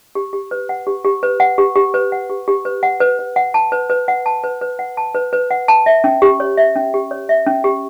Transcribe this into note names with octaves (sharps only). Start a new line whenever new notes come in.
G4
G4
B4
F#5
G4
G4
B4
F#5
G4
G4
B4
F#5
G4
G4
B4
F#5
B4
B4
F#5
A5
B4
B4
F#5
A5
B4
B4
F#5
A5
B4
B4
F#5
A5
E5
C#4
G4
C#5
E5
C#4
G4
C#5
E5
C#4
G4